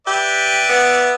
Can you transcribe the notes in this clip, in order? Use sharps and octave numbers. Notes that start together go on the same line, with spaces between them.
G4 B4 D5 E5
B3